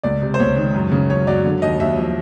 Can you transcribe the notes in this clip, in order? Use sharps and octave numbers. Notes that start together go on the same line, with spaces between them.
C#2 D5
C3
C5
C#2 C#5
D#3
F#2
C#3
F#2 C#5
F#3 D5
D3
D#2 D#5
D#2 E5
F3